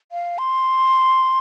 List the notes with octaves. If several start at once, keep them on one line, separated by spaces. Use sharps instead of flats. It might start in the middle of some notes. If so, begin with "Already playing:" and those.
F5
C6